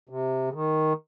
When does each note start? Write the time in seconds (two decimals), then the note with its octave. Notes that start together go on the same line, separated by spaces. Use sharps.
0.09 C3
0.49 C#3
0.53 D#3